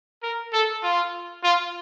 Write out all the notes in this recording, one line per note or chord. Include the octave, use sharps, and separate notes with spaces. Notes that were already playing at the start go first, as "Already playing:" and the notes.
A#4
A4
F4
F4